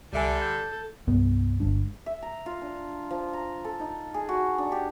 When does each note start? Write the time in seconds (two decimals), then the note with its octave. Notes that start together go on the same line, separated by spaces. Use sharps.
0.13 C2 D3 G3 A4 E5 G#5
0.42 G6
1.07 C2 G2 B3
1.60 G1 G#3 D4
2.06 E5
2.22 A#5
2.46 F4
2.61 D4
3.10 F3
3.33 A#5
3.65 A4
3.80 D#4
4.14 G#4
4.29 F#4
4.58 D4
4.72 G4